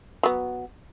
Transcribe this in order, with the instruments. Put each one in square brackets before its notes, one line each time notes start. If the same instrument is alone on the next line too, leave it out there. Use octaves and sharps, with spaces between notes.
[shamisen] F#3 B3